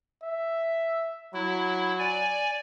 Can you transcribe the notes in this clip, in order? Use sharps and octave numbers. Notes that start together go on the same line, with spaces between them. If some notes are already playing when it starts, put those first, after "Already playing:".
E5
F#3 E4
D5 G#5